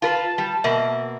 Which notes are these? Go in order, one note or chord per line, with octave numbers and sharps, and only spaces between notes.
F4 A#4 B4 A5
G3
B2 A#3 E5